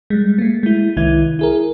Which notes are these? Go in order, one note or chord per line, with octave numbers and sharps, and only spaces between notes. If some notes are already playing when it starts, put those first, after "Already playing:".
G3 G#3
A3 A#3
G#3 E4
C2 D#3 E4 G#6
E4 G#4 A#4